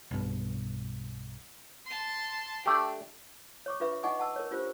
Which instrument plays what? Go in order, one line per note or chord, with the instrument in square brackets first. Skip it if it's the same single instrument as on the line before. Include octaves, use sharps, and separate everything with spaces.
[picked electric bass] B1 G2 B2
[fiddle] A5 C6
[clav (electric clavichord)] A3 G4 [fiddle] D4
[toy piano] C#5 C#6 D6
D4 F4 B4 E5 C#6
D#4 D#5 F#5 G#5 C#6 D6
F#5 A5 E6
A#4 C#5
D4 F4 G4 C5